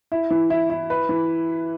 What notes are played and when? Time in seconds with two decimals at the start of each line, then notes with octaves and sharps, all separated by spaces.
0.12 E4
0.30 E3
0.50 E4
0.70 E4
0.90 B4
1.09 E3